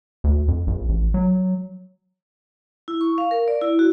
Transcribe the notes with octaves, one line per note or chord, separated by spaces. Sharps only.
D2
F2
A#1
A1
F#3
E4
C#6
F5
A#4
D5
E4
F#4